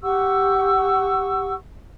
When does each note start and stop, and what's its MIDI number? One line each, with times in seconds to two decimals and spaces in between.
0.02 1.53 67
0.02 1.53 78
0.02 1.53 85
0.02 1.53 88